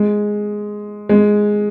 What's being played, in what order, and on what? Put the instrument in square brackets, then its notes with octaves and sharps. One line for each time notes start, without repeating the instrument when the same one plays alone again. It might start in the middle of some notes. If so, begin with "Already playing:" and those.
Already playing: [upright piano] G#3
G#3